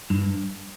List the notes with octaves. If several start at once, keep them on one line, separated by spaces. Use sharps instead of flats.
G2